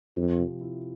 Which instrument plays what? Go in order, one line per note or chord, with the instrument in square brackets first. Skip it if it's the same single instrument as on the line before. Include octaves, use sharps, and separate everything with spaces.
[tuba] F2 [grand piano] F3
[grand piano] C3
E4